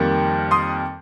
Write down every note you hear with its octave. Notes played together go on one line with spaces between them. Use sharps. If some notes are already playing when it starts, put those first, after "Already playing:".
Already playing: F2 D#3 G3 A#3
C6 D#6